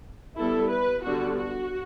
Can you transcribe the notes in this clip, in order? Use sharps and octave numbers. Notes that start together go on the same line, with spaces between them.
G3 B3 E4 A4
B4
D3 G3 B3 D4 F#4
F#4